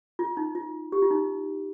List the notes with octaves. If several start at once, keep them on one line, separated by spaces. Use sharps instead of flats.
F4
D#4
F4
G4
F4
D#4